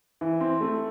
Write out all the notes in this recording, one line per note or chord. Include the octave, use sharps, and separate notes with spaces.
E3
C4
A3